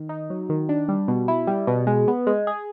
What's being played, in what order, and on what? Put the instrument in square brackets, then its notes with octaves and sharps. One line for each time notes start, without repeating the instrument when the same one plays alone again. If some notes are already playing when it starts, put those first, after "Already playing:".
Already playing: [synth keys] D#3
D#4
F#3
D#3
D4
G3
B2
E4
G3
B2
G#3
B3
G#3
G#4